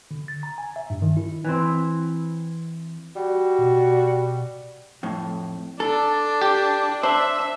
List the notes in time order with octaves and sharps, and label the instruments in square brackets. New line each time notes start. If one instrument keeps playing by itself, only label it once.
[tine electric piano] D3
A6
A#5
G#5
E5
G2
D#3
E4
[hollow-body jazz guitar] E3 C4
[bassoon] G3 [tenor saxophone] F#4
[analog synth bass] B2
[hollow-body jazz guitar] F2 A2
[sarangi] D4 [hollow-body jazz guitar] A4
[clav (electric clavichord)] G4
[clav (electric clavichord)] D4 [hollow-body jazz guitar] C5 [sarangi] E5